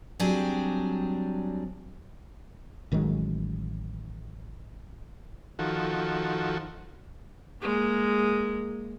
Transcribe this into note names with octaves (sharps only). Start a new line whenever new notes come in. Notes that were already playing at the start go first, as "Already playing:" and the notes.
F#3 G3 C4 D4 G#4
A1 D#3 F#3 G#3
D#3 F3 F#4 A4
G#3 A#3